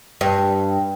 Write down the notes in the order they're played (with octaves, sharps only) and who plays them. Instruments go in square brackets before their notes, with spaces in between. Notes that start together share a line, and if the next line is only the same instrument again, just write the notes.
[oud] G2